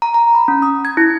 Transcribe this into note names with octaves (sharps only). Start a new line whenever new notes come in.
A#5
A#5
B5
C#4
D#6
G#6
E4